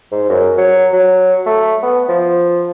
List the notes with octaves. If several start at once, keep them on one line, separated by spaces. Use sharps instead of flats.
G#2
F#2
F#3
F#3
A3
B3
F3